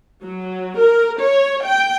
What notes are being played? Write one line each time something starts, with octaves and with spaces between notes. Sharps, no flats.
F#3
A#4
C#5
G5